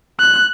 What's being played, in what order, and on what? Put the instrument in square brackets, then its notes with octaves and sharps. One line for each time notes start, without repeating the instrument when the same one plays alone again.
[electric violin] F#6